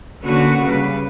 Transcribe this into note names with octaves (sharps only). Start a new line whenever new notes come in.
D3 A#3 B3 C#4 F#4 B4
C#3 G3 B4